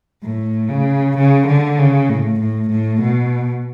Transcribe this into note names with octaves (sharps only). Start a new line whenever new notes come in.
A2
C#3
C#3
D3
C#3
A2
A2
A2
B2